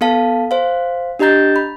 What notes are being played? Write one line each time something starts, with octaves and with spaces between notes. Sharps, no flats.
B3 A4 F5 A5
C5 F5
D4 G4 D#5 A#5 G6 A6
B5